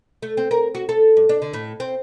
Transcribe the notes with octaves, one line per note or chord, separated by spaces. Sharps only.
A3
C4
A#4
F#4
A4
G2
D4
D3
A2
C4